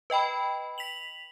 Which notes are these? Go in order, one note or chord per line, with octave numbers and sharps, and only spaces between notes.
B4 D#5 G5 B5
B6 F7 F#7